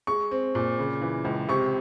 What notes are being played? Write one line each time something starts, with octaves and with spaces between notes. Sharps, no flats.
G#3 C#6
C4
A#2
C#3
E3
C#2
C3 C#6